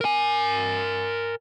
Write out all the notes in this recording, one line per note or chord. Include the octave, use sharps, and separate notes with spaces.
A#4 G#5